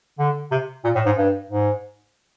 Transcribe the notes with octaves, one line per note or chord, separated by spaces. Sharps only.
D3
C3
A#2
A2
G#2
G2
G#2